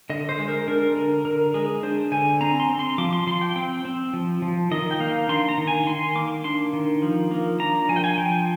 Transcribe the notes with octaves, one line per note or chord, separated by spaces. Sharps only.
D3 D#5
C5
G#3
A#4
D4 A#4
D3 A#4
D3 A#4
G#3 G#4
D4 C5
D3 G#5
C4 A#5
C6
C4
C6
F3 D6
C6
F3 C6
G5
C4 G5
C4
F3
F3
D#3 D#5
G5
A#3 F5
D4 C6
A#5
D#3
G#5
D#3 C6
A#3 D6
D4 C6
D#3
F3
A#3
D4 A#5
F3 G#5
G5
G#5
F3 G5